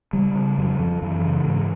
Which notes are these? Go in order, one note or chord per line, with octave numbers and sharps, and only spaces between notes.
C#3 G3
C#3
F2 F#3
F2 F3
F#2 E3
C#3
G#2